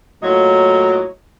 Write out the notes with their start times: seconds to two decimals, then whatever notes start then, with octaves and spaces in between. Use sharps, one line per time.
0.23 A2 F#3 A#3 F4 C#5 D#5